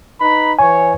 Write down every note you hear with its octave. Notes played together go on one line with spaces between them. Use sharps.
D#4 B4 B5
E3 C#5 G#5